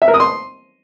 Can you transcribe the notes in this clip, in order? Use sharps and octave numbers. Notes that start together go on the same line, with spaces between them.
E5
A#4
D#6
C6